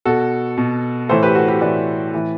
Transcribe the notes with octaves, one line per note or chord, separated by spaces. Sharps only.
B2 F#4 A4
B2
A2 E3 A4 C5
G4 B4
F#4 A4
G4 B4
A2 E3 B4 D5
A2 E3